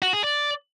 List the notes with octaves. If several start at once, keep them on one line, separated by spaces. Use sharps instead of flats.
F#4
G#4
D5